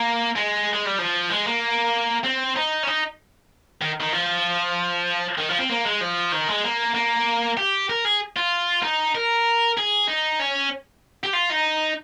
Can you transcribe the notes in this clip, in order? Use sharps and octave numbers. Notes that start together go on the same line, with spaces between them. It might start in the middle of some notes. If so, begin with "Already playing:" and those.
Already playing: A#3
G#3
G#3
G3
F3
G#3
A#3
C4
D#4
C#4
D#4
D#3
D#3
F3
D#3
F3
C4
A#3
G#3
F3
D#3
G#3
A#3
A#3
G4
A#4
G#4
F4
D#4
A#4
G#4
D#4
C#4
G4
F4
D#4